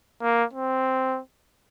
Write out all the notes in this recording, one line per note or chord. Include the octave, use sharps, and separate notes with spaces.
A#3
C4